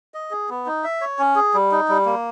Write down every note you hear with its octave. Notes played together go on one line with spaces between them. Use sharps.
D#5
G#4
B3
D#4
E5
C#5
C#4
G#4
G3
D#4
G3
A#3